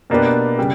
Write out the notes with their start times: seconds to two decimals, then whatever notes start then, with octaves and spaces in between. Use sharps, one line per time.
0.10 B2 A#3 D4 G4 B4
0.58 C#3 G3